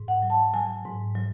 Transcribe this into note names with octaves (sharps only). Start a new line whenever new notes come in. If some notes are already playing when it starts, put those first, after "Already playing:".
Already playing: G#2
F#5
F#3
A5
F#3 G#5
G#2
F#3